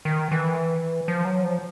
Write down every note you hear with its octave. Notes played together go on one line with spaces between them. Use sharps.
D#3
E3
F3
F#3
F3